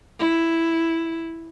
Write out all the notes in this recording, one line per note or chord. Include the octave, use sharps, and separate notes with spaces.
E4